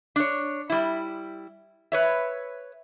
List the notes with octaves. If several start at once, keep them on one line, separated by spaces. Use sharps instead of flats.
D4 C#5
G3 E4
B4 C#5 E5